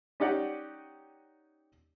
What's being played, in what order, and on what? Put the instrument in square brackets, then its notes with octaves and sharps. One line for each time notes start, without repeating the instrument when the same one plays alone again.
[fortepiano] C#4 D#4 G4 D5 F#5